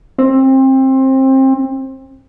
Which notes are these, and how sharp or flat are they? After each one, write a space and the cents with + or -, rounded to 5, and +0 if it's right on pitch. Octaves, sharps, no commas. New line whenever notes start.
C4 +25